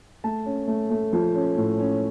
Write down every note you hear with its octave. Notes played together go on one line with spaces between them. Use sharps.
A3 A5
C#4
A3
A3
F3
C#4
A2
C#4